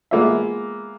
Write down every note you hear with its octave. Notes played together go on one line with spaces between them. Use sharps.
G#3 A#3 B3 F4 E5